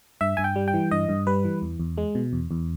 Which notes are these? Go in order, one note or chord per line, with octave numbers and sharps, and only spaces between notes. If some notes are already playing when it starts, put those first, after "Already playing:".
G2 E5
G2 G#5
G5
G3
G5
E3
G2 D#5
G2
G3 B4
E3
E2
E2
G#3
B2
E2
E2